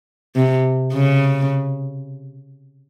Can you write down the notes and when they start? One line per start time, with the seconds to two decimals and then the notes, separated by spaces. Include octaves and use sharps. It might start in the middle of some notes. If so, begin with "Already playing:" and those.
0.36 C3
0.94 C#3